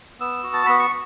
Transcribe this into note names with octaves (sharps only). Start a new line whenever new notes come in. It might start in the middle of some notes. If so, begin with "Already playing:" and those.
B3 E6
F#4
A5
B3 B5
C#6